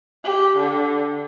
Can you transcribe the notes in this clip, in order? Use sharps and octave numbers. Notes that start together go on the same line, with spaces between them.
G4
D3